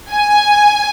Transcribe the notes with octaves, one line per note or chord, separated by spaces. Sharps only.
G#5